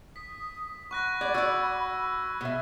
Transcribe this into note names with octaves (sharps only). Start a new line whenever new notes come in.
D#6 B6
F#5 B5 C#6 F#6 A#6
D5 F#5 G#6
F#4 D5 E6
B2 E5